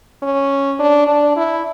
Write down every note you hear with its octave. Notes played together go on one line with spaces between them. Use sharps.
C#4
D4
D4
E4